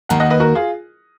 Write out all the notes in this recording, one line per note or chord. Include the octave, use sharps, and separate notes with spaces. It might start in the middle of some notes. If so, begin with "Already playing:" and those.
D#2 D#3 A#3 F#5 A#5
D#5 F#5
B4 D#5
F#4 A#4
F4 G#4